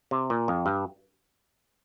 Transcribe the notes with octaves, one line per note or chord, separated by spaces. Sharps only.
C3
A#2
F2
G2